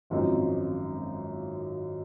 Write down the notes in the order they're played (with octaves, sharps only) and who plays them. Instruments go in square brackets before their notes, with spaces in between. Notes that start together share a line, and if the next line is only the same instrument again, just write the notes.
[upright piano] G#1 F#2 F3 C4 D#4